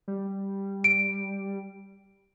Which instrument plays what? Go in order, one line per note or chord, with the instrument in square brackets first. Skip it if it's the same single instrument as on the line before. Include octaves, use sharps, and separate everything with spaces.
[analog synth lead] G3
[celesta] D7